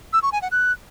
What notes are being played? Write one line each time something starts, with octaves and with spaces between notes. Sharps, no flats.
E6
C#6
G#5
F#5
F#6